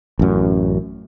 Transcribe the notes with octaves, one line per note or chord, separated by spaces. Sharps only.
A1 F#2